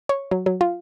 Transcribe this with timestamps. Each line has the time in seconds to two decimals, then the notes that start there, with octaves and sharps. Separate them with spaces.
0.09 C#5
0.31 F#3
0.46 F#3
0.61 F4